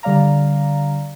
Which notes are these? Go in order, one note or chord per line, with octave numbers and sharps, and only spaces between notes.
D3 G3 D5 F5 A#5